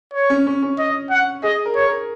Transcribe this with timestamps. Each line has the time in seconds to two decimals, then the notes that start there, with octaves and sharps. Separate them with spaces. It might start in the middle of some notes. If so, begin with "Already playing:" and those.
0.13 C#5
0.30 C#4
0.47 C#4
0.62 C#4
0.79 D#5
1.11 F#5
1.43 G#4 D#5
1.65 A#4
1.76 C#5
1.87 A#4